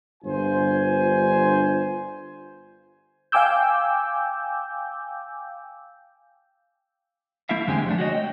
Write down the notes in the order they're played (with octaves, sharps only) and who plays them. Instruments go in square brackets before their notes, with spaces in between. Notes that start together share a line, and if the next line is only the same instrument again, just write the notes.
[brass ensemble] G1 G2 F4 C5 G#5
[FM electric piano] F5 G5 G#5 D6 E6 G6
[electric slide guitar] A3 E4 E5 F5
E2 D3 G#3 C4 G4 G#5
F3 A3 D4
F#4 C#5 D#5
G5